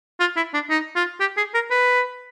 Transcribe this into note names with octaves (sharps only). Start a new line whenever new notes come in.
F4
E4
D4
D#4
F4
G4
G#4
A#4
B4